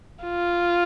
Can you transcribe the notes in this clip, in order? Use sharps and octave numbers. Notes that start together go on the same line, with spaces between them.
F4